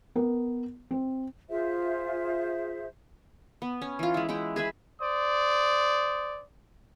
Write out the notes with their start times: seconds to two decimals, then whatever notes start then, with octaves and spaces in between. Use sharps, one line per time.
0.15 B3 A#4
0.91 C4
1.49 F4 G#4 C5 E5
3.62 B3
3.81 C#4
3.99 E3 F4
4.14 G#3 E4
4.29 G#3 E4 F#5 G5
4.56 G#4 B4 E5
5.01 C5 D5 D#6